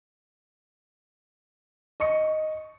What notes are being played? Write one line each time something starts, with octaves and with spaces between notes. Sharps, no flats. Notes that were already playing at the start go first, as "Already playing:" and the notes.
D#5 C#6 C#7